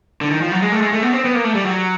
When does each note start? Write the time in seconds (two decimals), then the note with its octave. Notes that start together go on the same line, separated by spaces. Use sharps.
0.21 D3
0.31 D#3
0.41 F3
0.52 F#3
0.62 G#3
0.72 A3
0.82 G#3
0.93 A3
1.03 B3
1.13 C4
1.25 B3
1.35 A#3
1.44 A3
1.55 G3
1.65 F#3